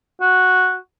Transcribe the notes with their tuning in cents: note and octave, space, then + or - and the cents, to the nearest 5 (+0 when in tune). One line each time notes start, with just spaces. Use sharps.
F#4 -5